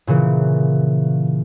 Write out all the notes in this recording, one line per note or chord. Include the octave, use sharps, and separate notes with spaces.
A#2 C#3 E3